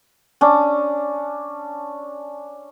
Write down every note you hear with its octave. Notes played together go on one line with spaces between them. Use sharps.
C#4 D4